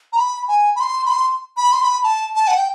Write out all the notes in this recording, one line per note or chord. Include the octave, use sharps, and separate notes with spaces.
A#5
B5
G#5
B5
C6
B5
C6
B5
C6
B5
A5
A5
F#5
G5